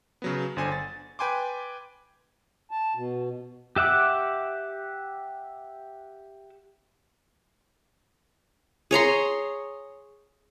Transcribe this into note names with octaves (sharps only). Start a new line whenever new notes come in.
C#3 F#3 B3
G1 D3 C5 G#5
A6
B4 G5 G#5 C6 D6
A5
B2
G4 E5 F#5 D6
G#4 C#5 A#5 C6